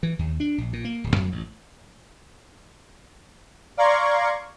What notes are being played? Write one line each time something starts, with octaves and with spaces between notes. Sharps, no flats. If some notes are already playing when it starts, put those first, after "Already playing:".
E3
D#2
D4
A#1
A#2
A#3
D1
F2
A1
D5 F5 A#5 C6 C#6 G#6